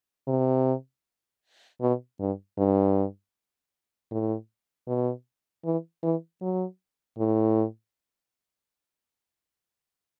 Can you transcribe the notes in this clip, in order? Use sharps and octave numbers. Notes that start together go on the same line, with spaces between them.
C3
B2
G2
G2
A2
B2
E3
E3
F#3
A2